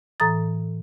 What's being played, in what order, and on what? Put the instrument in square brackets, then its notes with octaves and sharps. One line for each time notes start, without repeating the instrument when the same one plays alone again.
[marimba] A2 E3 A4 A#5 D#6 A6